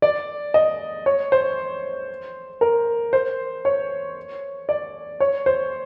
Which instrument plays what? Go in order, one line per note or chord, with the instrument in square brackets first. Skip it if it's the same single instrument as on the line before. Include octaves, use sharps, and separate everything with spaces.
[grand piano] D5
D#5
C#5
C5
A#4
C5
C#5
D5
C#5
C5